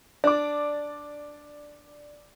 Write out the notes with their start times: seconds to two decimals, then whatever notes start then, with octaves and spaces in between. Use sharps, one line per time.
0.24 D4 D5 D6